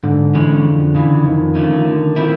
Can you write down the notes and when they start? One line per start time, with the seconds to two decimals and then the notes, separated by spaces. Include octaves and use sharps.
0.03 G#2 D3
0.34 E3 G#3 C#4
0.64 F2
0.95 C#3 E3
1.25 F2 D#3
1.55 D3 F3 A3 C#4
1.85 D3
2.16 F3 A3 C4 E4